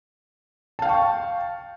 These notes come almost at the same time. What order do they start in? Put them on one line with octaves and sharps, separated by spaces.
A5 F5 G5 C#6